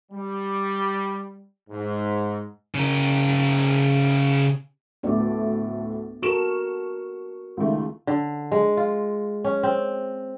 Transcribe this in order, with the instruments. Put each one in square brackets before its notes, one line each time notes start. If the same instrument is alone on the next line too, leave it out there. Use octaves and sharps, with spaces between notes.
[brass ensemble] G3
G#2
[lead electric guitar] C#3 A#4
[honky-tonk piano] D2 A2 A3 [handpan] B3 D4 D5
[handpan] B3
[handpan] F#4 A4 A#4 [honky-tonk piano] C#6 E7
[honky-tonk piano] C#2 D#3 A3
[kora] D3
G#3
F4
C#4
C4